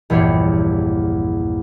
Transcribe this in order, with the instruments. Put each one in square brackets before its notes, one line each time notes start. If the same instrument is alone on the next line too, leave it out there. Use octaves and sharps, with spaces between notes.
[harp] A#1 E2 G2 G4 C#5 C6